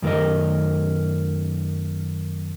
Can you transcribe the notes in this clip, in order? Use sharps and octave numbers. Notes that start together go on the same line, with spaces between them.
F#2 D#3 A3 A#4 D#5